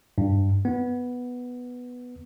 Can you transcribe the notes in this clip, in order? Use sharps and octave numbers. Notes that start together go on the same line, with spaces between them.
G2
B3